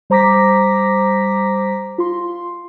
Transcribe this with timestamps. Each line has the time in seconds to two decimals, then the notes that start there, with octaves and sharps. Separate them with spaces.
0.10 G3 C5 A#5 D6 A#6 B6
1.98 F4 C6